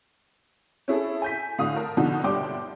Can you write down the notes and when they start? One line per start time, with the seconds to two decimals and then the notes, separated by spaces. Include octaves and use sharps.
0.88 C#4 E4 G#4 A4
1.22 G#5 G6 B6
1.58 A2 D3 F#4 F5 D#6
1.76 A#4 A5
1.97 B2 D3 F3 D#4 F#4
2.24 G1 G3 D4 G5 D6